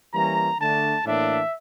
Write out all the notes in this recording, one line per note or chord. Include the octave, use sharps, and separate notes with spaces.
E3 G3 A#3 C#4 A#5
D3 A3 D4 A5
A2 E3 A#3 D4 E5